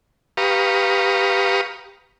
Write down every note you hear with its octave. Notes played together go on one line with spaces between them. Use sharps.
G4 B4 F5 A#5 C#6 D#6